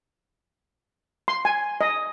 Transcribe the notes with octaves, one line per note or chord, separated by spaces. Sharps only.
C6
G#5
D#5